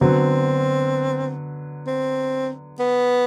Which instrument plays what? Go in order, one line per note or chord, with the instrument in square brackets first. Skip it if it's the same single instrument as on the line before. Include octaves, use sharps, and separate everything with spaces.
[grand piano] D3 F#3 B3 [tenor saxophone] C4
[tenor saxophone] C4
B3